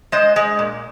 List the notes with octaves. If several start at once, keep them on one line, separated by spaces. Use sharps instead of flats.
G#3 C5 D#5
G#3
A#2